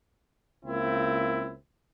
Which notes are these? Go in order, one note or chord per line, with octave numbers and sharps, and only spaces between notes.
C#2 A#3 C4 E4